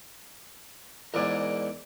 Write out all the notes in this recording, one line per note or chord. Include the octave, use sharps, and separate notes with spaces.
E2 G#2 A#4 D5 G#5